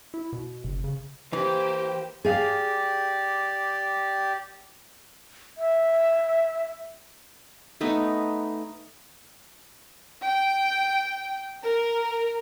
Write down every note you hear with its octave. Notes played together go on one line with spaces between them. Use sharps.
E4
B2
F#1
C#3
E3 A#3 G4 C5
G4 G#4 D5 F5
E5
A3 B3 D#4
G5
A#4